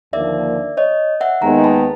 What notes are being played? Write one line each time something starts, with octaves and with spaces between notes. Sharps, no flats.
D#2 D3 F3 A#3 D4 D5 E5
C#5 D#5
E5 F#5
D#2 D#3 G#3 B3 D#4 G#5 A#5
A5 B5